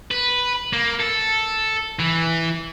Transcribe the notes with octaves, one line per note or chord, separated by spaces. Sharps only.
B4
A#3
A4
E3